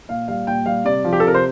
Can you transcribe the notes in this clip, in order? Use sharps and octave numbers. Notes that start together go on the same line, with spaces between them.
A#2 F5
G3 F5
A#2 G5
G3 F5
C3 D5
F3
G4
A4
C3 A#4
C5